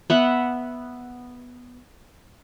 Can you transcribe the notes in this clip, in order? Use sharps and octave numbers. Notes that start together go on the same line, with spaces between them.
B3 E5 F#5